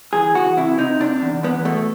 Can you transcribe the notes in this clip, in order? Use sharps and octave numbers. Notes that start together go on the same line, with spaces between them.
E3 G#4
E3 F#4
C3 E4
C3 D#4
C3 D4
E2
E2 B3
B2 A3